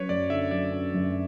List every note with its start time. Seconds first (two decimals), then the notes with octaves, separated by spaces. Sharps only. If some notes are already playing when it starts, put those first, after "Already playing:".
Already playing: F#3 C#4 B4 C#5
0.09 F#2 D5
0.30 D3 E5
0.51 F#3 D5
0.72 C#4
0.94 F#2